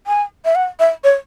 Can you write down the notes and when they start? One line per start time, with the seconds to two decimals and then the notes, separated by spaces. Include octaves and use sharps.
0.07 G#5
0.45 E5
0.55 F#5
0.80 E5
1.04 C#5